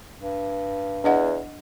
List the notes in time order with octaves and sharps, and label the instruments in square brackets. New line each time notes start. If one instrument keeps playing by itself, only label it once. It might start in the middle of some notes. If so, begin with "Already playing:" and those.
[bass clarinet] G2
[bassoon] E2 [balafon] D4 D#5 F#5